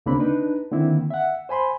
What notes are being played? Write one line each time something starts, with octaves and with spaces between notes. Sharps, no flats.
D2 C#3 A#3 C4 D4 B5
D4 D#4 B4
D3 D#3 A#3 C4 E4
E5 F#5
C5 G#5 B5 C6